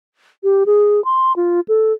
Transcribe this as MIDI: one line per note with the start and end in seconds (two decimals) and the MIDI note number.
0.44 0.64 67
0.66 1.03 68
1.05 1.33 84
1.36 1.60 65
1.68 1.92 69